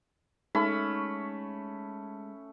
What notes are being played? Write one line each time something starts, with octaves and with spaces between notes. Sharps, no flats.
G#3 A3 C#4 D#4 B5